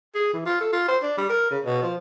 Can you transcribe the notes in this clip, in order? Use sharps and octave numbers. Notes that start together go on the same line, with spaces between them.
G#4
E3
F4
A4
F4
C5
D4
G3
A#4
C#3
B2
F3